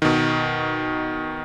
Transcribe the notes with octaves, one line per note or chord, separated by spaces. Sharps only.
B2 D#3